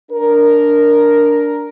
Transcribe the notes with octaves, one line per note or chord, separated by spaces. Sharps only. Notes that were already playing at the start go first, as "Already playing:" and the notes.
D4 A#4